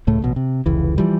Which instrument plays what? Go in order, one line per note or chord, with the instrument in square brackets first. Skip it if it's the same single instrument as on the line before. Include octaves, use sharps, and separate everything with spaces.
[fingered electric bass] C#2 A2 A3
A1 B2
C3
F1 C#2 E3
E3 F3 G3